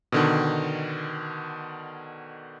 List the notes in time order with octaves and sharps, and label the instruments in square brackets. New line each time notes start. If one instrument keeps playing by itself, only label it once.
[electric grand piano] B2 D3 D#3